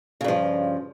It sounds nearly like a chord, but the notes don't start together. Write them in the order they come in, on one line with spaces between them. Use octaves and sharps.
C#3 G2 F3